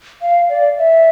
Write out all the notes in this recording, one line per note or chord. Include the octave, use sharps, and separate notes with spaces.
F5
D5
E5